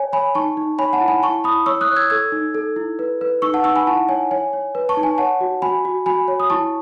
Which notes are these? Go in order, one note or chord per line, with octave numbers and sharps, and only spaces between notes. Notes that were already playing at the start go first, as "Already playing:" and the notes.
Already playing: C#5 G#5
C#5 G#5 B5
D#4 A5 C#6
D#4
C#5 G#5 B5
F#5 A5
E4
G#5 B5
E4 A5 C#6
E4 B5 D#6
C#5 C#6 E6
D#6 F#6
C#5
E6 G#6
A4 E6 G#6
D#4
A4
E4
B4
B4
D#4 C#6 E6
F#5 A5
D#4 C#6 E6
G#5 B5
E4 F#5 A5
C#5 G#5
C#5 G#5
C#5
B4
A5 C#6
D#4
G#5
C#5 F#5 A5
F#4
F#4 G#5 B5
F#4
F#4 G#5 B5
C#5
D#6
E4 A5 C#6